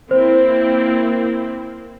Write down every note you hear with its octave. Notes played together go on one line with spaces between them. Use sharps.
A#3 C4 E4 C5